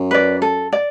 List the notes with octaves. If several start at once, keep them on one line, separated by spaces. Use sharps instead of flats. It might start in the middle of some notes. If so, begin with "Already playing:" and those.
Already playing: F#2
B4 D5
A4
D5